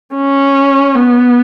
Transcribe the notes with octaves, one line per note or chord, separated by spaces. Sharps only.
C#4
B3